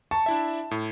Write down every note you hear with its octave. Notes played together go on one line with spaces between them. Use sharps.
A5 C#6
D4 E4 E5
A2